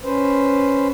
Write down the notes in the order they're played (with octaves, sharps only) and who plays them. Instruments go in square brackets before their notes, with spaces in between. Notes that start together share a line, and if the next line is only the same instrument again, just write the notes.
[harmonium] C#4 B4 C5